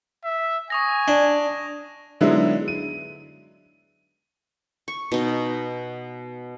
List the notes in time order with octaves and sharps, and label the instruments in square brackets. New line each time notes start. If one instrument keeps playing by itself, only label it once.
[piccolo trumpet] E5
[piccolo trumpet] G#5 [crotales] C#6 D#6 A#6
[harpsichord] D4
[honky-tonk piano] D3 F#3 G#3 B3 D#4 E4
D#7
[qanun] C#6
B2 D#4